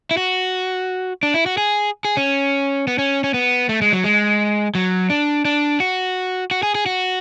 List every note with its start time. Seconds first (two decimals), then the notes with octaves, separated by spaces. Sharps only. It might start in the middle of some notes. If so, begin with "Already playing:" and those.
0.11 E4
0.17 F#4
1.23 D4
1.34 E4
1.46 F#4
1.58 G#4
2.05 G#4
2.17 C#4
2.87 B3
2.99 C#4
3.24 C#4
3.34 B3
3.69 A3
3.82 G#3
3.92 F#3
4.04 G#3
4.75 F#3
5.10 D4
5.45 D4
5.80 F#4
6.51 F#4
6.63 G#4
6.75 G#4
6.86 F#4